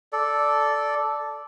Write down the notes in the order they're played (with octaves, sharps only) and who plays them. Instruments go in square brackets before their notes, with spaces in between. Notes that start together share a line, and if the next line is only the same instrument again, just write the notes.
[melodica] A4 D5